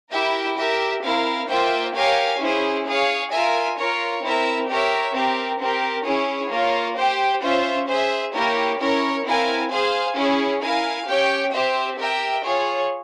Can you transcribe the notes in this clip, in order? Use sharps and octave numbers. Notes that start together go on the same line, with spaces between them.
E4 G4 A#4 E5 G5
G4 A#4 E5
C4 E4 A#4 F5
A#3 F4 C5 E5 G5
G4 A#4 C#5 F5 G#5
C#4 E4 G#4 C5
G#4 C#5 F5
F4 A#4 E5 G#5
F4 A#4 C#5
C4 E4 A#4 E5
G4 A#4 C#5 E5
C4 G4 A#4
C4 G4 A#4
C#4 E4 G#4 C#5
A#3 F4 A#4 C#5
G4 C5 G5
C#4 F4 C5 E5
G#4 C5 E5
A#3 E4 G4 A#4 C#5
C#4 E4 A#4 C#5
C4 E4 A#4 F5 G#5
G#4 C5 F5 G#5
C#4 E4 G#4 C#5
E4 A#4 F5 G#5
C#4 G4 C#5 G5
C4 G4 C5 E5
G4 A#4 E5 G5
F4 G#4 C#5